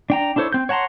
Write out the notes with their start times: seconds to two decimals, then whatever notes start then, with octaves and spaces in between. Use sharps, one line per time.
0.10 D4 G5 A#5
0.36 D4 E4 A4 C5 C#5
0.52 C4 G6
0.69 C#5 F#5 A5 A#5 C6